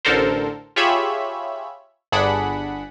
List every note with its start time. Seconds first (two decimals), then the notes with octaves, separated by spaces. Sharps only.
0.05 A1 D3 A4 A#4 C5
0.76 F4 G4 G#4 C#5 E5 B5
2.12 G1 D4 G#4 F#5 B5